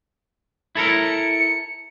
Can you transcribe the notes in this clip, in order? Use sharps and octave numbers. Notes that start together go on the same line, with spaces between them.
E4 A4 A#4 C#7